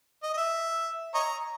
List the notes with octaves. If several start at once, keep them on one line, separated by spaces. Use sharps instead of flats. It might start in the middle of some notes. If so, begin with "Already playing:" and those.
D#5
D#5
E5
C#5 D#5 A#5